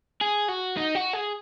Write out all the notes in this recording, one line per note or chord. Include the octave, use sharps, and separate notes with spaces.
G#4
F#4
D#4
F#4
G#4